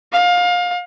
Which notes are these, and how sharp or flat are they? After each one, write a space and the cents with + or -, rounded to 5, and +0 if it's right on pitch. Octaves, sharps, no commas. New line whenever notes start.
F5 +25